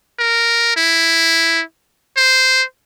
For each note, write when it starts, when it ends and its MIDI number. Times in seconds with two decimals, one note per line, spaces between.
0.19 0.73 70
0.77 1.62 64
2.17 2.63 72